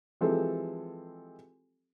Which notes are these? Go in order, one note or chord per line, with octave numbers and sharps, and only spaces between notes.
E3 F3 G#3 C4 G4 A4